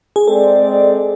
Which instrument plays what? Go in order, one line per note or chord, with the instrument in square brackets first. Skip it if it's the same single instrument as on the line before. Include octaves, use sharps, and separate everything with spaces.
[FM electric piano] G#4
[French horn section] G#3 C4 G#4 D5 [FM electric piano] A4